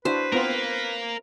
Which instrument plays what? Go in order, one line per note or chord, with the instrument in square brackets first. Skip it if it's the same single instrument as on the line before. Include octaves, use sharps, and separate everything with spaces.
[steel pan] D4 E4 F#4 [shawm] B4 [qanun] C5
[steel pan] B3 C4 F4 [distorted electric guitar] A#4 F5